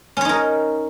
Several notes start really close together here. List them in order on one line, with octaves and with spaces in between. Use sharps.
C#4 C#5 D#4 A#4